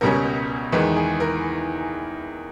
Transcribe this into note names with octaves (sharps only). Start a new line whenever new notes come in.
C#2 B2 G3 C#4 A#4
E2 D#3 G#3 B4
G#4
A#4